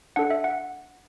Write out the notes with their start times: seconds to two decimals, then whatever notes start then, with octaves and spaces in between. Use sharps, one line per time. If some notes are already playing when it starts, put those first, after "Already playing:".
0.16 D4 A4 F#5
0.30 E5
0.44 F#5